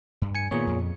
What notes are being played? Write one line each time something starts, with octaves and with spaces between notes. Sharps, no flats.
G2
G#5 C#7
A#2 D#3 B3 G#4 C#5
F2